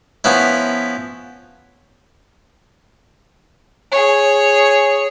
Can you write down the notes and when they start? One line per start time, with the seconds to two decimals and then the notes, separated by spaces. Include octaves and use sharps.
0.24 F3 B3 C#4 E4
3.91 G#4 C#5